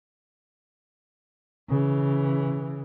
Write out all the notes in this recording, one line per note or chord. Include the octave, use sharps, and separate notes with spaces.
C#3 E3